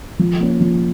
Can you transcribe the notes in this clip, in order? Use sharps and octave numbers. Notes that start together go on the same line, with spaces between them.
F3
A#3 C#4
F3